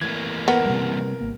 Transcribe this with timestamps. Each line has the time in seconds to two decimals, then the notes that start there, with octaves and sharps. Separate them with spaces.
0.01 E3 A3 A#3 G#6
0.48 B3 A#4
0.66 C3 G3
1.21 G#1 A#3